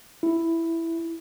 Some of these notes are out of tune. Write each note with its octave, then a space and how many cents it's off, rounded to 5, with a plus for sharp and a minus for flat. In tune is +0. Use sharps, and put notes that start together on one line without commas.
E4 +5